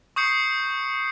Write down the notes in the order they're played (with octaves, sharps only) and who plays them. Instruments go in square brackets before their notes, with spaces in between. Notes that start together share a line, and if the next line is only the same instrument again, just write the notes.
[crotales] C#6 D#6 G6 C7 C#7